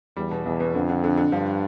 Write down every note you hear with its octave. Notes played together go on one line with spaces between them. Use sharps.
E2 G3
B2
B1 E2
B2
F2 D3
D3
D3
D3
G2 F3